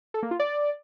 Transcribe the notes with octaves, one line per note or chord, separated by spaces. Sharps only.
A4
A#3
F4
D5